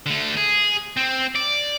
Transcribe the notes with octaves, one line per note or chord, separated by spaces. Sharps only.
D3 A3
G#4
C4
D5